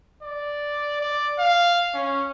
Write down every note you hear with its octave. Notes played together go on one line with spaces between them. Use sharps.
D5
D5
F5
C#4